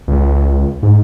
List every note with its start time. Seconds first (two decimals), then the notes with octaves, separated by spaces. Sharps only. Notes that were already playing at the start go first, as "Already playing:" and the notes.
0.08 C#2
0.83 G#2